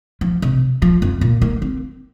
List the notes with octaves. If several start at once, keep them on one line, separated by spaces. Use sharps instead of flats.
F3
C3
F3
F2
A#2
A#3
C4